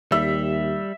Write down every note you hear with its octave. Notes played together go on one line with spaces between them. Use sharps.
D#2 G3 E5